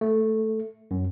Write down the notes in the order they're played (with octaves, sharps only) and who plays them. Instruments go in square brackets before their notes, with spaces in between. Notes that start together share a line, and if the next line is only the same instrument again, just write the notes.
[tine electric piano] A3
F#2